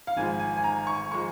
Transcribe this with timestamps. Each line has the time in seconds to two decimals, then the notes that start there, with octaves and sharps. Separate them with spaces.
0.07 F5
0.16 G#1 G#2 F3 G#3 G#5
0.40 G#5
0.57 G#5
0.64 A#5
0.87 C#6
1.12 F3 G#3 C#6